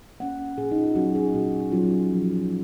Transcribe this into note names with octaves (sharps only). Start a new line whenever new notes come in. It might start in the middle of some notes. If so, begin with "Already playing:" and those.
A#3 C#4 F#5
A#2 G#4
D#4
F4
F#3 C#4 F#4
G#4
A#2 F#4
F#3 C#4 F4
F3